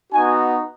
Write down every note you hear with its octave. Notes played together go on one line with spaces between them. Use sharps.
B3 D#4 F#4 G#5